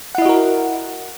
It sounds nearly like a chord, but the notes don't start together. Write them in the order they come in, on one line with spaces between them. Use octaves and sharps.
F#5 E4 D#5 F#4 A#4